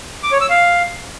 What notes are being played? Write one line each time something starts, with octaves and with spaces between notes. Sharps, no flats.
D6
C#5
E6
F5